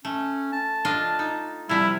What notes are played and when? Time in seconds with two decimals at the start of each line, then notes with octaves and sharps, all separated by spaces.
0.05 A3 C#4
0.53 A5
0.85 D4 F4 D#5
1.19 D#4
1.69 C3 F3 G3 E4